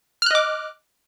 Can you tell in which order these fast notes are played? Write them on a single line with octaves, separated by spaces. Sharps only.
F6 F#6 D#5 D6